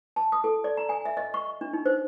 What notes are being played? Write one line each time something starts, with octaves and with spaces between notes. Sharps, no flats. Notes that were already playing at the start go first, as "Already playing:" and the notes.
A5
D#6
A4
D5
A#5
G#5
E5
D#5
C#6
D4
D#4
C5